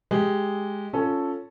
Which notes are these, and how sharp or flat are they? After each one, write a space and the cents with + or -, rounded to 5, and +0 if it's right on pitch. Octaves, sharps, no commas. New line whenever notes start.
G#3 +0 G4 +0
C#4 +5 F4 +0 A4 +0